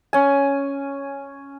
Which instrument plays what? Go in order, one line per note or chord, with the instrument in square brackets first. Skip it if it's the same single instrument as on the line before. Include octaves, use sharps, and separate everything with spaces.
[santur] C#4 G#5